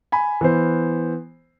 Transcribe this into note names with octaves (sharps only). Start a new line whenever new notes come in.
G#5 B5
E3 B3 C5